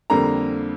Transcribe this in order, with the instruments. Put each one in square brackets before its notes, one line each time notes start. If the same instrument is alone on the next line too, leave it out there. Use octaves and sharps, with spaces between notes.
[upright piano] F2 D3 G3 A#3 A#5